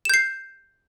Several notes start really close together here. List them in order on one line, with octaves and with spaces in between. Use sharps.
E7 G6 C7